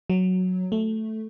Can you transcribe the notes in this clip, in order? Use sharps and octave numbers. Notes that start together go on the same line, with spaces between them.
F#3
A3